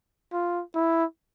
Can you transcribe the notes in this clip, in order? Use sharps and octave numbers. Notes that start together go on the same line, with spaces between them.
F4
E4